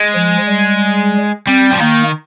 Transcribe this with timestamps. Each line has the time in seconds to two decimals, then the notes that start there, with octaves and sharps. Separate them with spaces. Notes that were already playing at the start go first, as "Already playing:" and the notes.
Already playing: G#3
0.15 F3
0.48 G3
1.47 G3 C4
1.72 F3
1.80 D#3 A#3